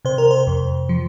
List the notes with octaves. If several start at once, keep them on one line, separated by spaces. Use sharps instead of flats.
C3 C5
A#4
C5
F2
F3